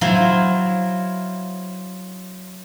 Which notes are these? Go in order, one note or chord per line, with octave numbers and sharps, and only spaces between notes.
F#3 E4 F4 C5